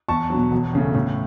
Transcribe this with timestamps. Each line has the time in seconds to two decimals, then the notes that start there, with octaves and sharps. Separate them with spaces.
0.08 E2 A5 C#6
0.30 B2 F#3
0.51 E1
0.73 E2 C#3 A3
0.94 A2